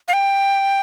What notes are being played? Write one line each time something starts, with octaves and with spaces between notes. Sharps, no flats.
F5
G5